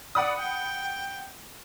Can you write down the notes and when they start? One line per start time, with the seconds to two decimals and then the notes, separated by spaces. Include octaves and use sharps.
0.15 D5 F#5 B5 D#6
0.38 G5